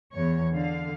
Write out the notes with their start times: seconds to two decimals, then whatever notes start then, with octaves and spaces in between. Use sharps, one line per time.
0.14 E2 C#5
0.55 D3 F5